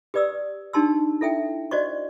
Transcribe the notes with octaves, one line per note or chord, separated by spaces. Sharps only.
G4 B4 D5 D#6 E6
D4 D#4 G4 A5 C6 E6
E4 A4 E5 G5
F#4 C5 D5 D#5 C#6